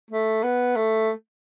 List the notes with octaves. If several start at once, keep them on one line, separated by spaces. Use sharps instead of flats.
A3
B3
A3